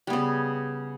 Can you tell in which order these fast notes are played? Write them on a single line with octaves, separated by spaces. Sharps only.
G3 B3 C#3